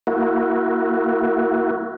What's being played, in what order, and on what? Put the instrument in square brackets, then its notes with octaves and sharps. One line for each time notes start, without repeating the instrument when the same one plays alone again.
[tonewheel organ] A#3 E4 F#4